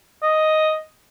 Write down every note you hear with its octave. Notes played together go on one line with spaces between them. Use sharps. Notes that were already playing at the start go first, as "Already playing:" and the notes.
D#5